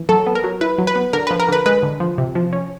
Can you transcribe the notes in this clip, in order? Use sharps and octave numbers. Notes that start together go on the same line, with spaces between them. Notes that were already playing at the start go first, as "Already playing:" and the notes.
Already playing: E3
F#3 A4
B3
A#4
F#3
E4 B4
F#3
B4
B3
D3 A#4
B4
F3
A#4
D3 B4
G#3 B4
D3
F3
C3
F3
C#4